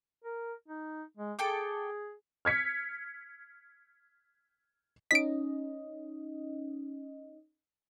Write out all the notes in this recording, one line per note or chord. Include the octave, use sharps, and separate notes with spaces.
A#4
D#4
G#3
G#4 A4 G5 D6
F6 G#6 B6 C#7
C#4 D#4 D#5 B6 D7